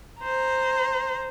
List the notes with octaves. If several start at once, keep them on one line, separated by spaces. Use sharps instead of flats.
C5 A#5